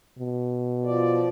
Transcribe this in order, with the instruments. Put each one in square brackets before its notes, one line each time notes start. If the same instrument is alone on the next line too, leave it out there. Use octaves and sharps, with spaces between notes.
[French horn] B2
[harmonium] F3 D5